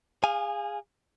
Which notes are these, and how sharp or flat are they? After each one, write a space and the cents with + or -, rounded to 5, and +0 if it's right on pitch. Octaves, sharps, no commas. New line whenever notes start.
G#4 -30 F5 +0 G#5 +0